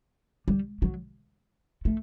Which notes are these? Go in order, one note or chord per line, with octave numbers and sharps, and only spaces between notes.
G3
F#3
A3